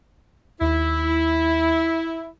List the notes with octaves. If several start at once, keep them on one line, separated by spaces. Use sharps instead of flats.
D#2 E4